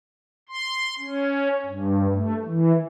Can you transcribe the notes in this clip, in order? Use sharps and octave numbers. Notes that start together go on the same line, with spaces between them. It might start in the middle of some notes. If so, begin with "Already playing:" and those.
C6
C#4
G2
A3
E3